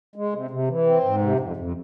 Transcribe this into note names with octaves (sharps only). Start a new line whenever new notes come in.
G#3
C3
C3
E3
C4
G#2
C3
F2
F2